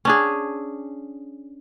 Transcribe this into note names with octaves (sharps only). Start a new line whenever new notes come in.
C#4 D4 G#4